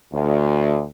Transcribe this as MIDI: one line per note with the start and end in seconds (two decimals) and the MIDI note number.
0.13 0.85 38